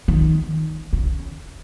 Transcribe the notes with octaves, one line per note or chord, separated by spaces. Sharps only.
D#3
C#3